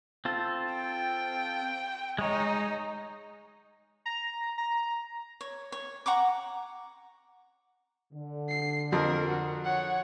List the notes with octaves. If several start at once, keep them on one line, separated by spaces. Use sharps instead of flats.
C4 F4 A4
G5
G#3 D#4 C#5
A#5
A#5
C#5
C#5
F#5 A#5 C#6 D6
D3
C7
F2 A#4
F#4
C#5 F#5